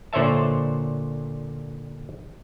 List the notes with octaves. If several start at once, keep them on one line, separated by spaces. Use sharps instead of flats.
A#2 D3 C5 C#5 E5 A5